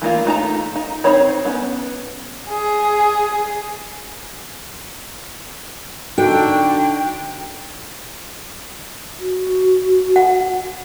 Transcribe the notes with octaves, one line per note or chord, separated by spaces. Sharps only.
E3 A3 A#3 F4
A3 D#4 A5 A#5
D#4
C4 D#4 C5 C#5 B5
B3 C#4
G#4
D3 D4 D#4 F#4 A4 G5
F#4
F#5